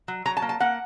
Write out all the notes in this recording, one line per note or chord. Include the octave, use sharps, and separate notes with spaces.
F#3
F#3 A#5
A5
A#3
A5
A#3 F#5